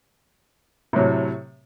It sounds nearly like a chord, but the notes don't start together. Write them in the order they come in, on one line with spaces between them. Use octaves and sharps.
C3 F#3 A2